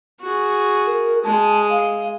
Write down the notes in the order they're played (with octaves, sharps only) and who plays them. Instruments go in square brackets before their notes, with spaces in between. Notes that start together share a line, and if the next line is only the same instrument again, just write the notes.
[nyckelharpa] F#4 G#4
[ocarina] A#4
[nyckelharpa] G#3 D#5 [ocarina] A5
[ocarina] F5